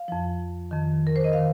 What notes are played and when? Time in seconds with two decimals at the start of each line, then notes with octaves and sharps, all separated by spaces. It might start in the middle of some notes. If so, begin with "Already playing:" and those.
Already playing: F5
0.08 F2 F3
0.71 F2 D#3
1.07 A#4
1.16 C5
1.24 D#5
1.33 D#3 F5